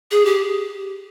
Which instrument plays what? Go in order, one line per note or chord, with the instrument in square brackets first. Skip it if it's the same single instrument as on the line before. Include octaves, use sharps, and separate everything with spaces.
[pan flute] G#4
G4